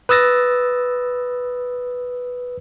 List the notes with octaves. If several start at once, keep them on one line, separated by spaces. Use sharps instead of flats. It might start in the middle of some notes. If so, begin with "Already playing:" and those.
B4 D#6 E6 A6 A#6